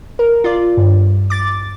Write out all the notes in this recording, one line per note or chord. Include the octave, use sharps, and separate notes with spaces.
A#4
F4 D5
G2
D6 A6